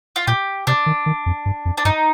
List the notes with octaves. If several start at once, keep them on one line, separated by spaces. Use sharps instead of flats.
F4
A#2 G4
C3 D4
D#3
D#3
F2
G2
F2
D4
G2 D#4